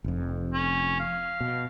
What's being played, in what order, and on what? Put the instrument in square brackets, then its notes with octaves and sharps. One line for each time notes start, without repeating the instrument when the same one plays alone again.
[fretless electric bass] F1 F2
[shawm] C#4
F5
[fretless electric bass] B2